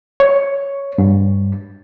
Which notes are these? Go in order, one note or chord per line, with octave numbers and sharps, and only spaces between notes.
C#5
G2